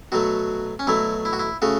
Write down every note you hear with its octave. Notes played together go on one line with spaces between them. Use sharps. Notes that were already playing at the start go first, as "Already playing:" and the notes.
B2 F#3 A3 F#4
C#4
B2 F#3 A3 E4
E4
F#4
E4
C#3 A3 F#4